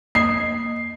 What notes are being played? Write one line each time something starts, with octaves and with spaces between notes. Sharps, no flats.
A#3 D#5 D#6 C7